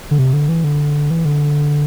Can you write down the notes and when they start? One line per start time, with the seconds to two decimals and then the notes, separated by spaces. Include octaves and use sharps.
0.11 D3
0.18 C3
0.33 D3
0.49 E3
0.64 D3
1.10 E3
1.25 D3